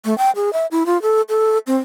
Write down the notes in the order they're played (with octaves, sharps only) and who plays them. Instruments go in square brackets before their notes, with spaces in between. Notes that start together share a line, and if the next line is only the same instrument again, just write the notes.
[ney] A3
G5
G#4
E5
E4
F4
A4
A4
C4